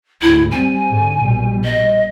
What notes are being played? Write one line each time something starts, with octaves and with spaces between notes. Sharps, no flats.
D2 G#2 E4
G3 C4 G#5
G#2 D3
A#1 B2 G3
D#5